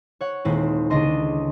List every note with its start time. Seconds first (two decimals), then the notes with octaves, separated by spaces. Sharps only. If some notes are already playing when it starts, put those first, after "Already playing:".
0.21 C#5 F#5
0.45 D#1 G#3 C4 E4
0.90 C#2 D3 D4 D#5 C6